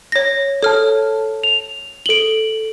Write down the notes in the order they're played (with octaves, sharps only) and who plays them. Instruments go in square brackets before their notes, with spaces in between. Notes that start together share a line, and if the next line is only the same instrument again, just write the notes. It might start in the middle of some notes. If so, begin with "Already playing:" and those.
[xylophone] C#5 A#6
[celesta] A4 A5 [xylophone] C#5 F6
[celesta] F7
[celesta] A4 F#7 [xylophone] D7 G7